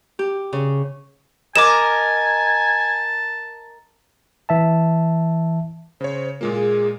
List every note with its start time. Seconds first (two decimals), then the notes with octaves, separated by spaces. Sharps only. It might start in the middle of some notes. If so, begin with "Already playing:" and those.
0.19 G4
0.53 C#3
1.56 A#4 D#5 G#5 A5 D6 E7
4.49 E3 E5 A5
6.01 C#3 C5 C#5
6.41 A#2 G#3 A#3 F4
6.54 G#4